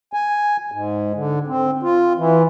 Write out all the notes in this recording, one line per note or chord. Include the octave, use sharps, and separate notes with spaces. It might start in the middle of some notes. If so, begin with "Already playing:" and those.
G#5
G#2
D3
C4
F4
E3